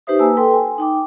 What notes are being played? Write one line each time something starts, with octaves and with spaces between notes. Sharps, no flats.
D#4 G4 B4 C5 E5 D#6
A#3 B4 G#5 A5 E6
A4 B4 G5 C6
G#5
D#4 G5 D6